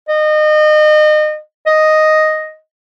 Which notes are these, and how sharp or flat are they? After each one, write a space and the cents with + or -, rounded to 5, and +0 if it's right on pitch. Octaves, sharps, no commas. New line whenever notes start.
D#5 -30
D#5 +0